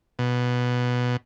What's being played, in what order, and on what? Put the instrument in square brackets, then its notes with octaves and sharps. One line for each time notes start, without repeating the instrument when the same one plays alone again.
[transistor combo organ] B2